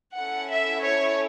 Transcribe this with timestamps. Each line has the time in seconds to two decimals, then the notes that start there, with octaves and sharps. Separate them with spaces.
0.16 C#4 E4 A4 F#5
0.51 E5
0.84 C#5